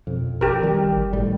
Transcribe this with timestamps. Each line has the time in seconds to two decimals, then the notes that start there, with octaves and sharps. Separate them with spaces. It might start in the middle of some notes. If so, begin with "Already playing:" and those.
0.07 F2 B2
0.41 A1 G4 A#4
0.63 A1 D#3 G3
0.97 G1
1.13 A1 A2 G3